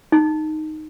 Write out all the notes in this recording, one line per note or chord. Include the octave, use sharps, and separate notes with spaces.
D#4